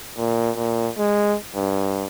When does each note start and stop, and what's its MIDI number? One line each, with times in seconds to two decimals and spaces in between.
0.17 0.51 46
0.57 0.90 46
0.97 1.35 56
1.55 2.07 43